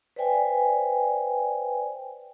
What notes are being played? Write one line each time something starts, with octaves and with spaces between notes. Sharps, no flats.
B4 C5 D5 E5 G5 G#5